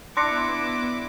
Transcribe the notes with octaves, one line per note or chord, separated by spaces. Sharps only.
B3 D4 E4 C6 D6 A#6 C#7